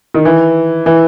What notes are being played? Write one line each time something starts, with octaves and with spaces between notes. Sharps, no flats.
D#3
E3
E3